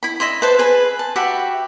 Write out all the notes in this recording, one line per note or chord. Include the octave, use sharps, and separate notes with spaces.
E4 B5
D#5 E5 B5 C6
B4 C5 A5
G#4 B4 G#5
A5
F#4 G4 E5 B5